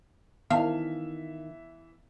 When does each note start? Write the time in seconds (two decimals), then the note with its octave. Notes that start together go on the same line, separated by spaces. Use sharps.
0.50 D#3 E3 B3 E5 F5 A5